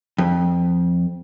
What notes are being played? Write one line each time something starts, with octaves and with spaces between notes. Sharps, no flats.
F2